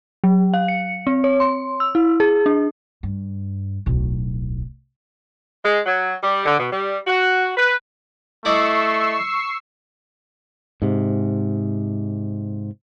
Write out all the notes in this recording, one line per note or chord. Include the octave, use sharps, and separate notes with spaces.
F#3
F5
C#7
C4
C#5
C6
E6
E4
G#4
D4
G2
D1 B1
G#3
F#3
G3
D3
B2
G3
F#4
B4
A3 E4 D5 D#5 C#6 E6 C7
G#2 C3